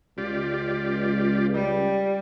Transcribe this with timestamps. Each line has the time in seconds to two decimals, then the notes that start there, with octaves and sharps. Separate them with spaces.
0.18 C#2 F4 G4 D5
1.54 G3